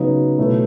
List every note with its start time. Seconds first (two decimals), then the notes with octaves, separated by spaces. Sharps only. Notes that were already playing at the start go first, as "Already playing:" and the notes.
Already playing: C#3 F#3 B3 D#4
0.38 B2 F#3 A3 E4 B4